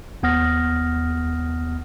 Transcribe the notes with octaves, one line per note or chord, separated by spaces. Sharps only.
D#2 B3 F#5 D#6 F6 A#6